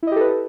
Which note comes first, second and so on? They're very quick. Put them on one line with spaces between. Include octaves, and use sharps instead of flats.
E4 D#5 G4 A4 B4